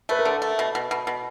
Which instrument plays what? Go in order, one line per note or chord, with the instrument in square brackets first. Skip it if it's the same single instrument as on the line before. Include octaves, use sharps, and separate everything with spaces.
[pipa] A3 [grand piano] B4
[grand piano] A#4
[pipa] D3 [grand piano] A4
[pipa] A3
B2
B2
B2
B2